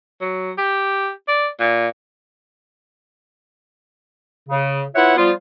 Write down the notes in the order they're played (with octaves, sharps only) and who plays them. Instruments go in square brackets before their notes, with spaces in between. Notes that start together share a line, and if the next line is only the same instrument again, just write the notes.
[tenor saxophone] F#3
G4
D5
A#2
[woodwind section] C#3
B3 E4 F4 C#5 E5 F#5
F3 G3 B3 F4